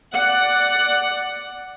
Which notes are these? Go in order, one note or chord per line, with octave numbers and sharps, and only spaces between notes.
D5 F#5